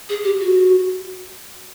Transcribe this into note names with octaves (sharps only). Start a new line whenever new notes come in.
G#4
G4
F#4